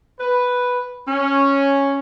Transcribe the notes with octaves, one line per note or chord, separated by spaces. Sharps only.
B4
C#4